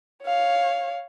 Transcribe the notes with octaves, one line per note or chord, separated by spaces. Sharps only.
C#5 F5